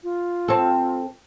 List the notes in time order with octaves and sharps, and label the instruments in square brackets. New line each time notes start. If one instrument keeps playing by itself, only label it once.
[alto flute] F4
[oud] C4 A4